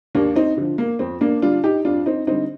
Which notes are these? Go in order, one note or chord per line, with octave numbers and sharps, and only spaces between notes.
D#2 A#3 D4
C4 D#4
D3 F3
A#3
F2 C4
A#3 D4
D3 G3 D4 F4
D#4 G4
F2 D4 F4
C4 D#4
D3 G3 C4 D#4